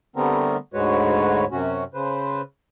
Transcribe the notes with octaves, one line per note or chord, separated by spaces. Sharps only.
D3 G3 A3 B3 C4 A#4
D2 G#2 G#3 F#4 B4 C#5
F#2 C3 C#4 F#4
C#3 B4 C5